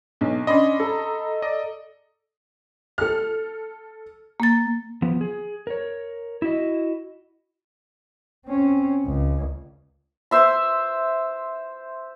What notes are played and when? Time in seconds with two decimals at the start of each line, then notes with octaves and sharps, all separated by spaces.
0.21 B1
0.47 C#4 D4 D#5 B5 C6
0.80 A4 A#5
1.42 D5 D#5
2.98 A4 F6
4.40 A#3 A6
5.02 F3 B3
5.21 G#4
5.67 A#4 C#5
6.42 E4 F#4 D#5
8.46 C4 C#4
9.05 C#2
10.31 C5 E5 C6